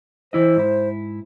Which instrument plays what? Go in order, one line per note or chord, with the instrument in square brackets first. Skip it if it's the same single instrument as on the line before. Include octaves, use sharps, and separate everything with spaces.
[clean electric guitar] E3 E4 D#5 [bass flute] C5
[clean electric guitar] G#2 E4